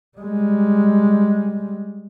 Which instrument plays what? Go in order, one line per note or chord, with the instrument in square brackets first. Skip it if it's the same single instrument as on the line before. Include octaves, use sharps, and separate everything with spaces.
[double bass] G3 G#3